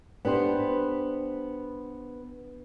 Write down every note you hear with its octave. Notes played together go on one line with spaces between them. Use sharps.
B3 D4 G4 C5